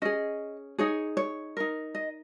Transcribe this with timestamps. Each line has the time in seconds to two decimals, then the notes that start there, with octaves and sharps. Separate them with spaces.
0.02 C#4 G#4 D#5
0.78 D#4 G#4 C#5
1.17 C#5
1.57 D#4 A#4
1.95 D#5